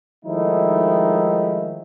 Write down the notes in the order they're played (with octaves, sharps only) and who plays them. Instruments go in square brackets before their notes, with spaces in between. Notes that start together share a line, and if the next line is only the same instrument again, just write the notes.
[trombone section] D#3 F3 G#3 A3 D#4 E4